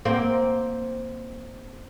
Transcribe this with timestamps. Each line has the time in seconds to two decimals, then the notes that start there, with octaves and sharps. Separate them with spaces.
0.05 A#3 C4